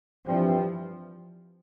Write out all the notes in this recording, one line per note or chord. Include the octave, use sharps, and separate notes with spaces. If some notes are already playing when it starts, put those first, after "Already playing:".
G2 E3 F3 G3 C4